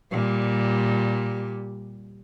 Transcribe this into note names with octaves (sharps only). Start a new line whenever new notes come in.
A#2 G3